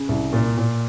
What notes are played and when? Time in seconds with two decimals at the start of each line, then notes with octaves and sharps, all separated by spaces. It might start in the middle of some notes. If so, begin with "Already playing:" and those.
Already playing: C#3
0.09 C2
0.33 A#2
0.57 A#2